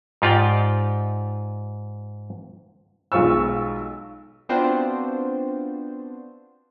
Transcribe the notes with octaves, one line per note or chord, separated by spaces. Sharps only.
G#2 D#4 F4 G4 D5 G5
B1 G#3 F4 C#6 E6
B3 C4 D4 F4 F#4 C5